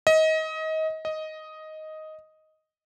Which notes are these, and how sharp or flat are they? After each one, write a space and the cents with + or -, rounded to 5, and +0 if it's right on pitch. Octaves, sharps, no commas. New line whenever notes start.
D#5 +25
D#5 +5